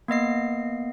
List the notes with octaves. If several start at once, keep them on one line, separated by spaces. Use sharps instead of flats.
A#3 B3 D#5 C7